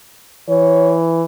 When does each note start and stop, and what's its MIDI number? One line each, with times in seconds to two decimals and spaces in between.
0.49 1.24 52
0.49 0.95 73